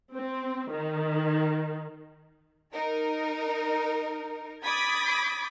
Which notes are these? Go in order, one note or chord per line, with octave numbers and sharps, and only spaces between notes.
C4
D#3
D#4 A#4
B5 D6 D#6 G#6 A6 B6